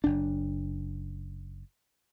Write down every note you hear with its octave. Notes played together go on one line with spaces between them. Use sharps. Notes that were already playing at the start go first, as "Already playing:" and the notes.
F#1 D4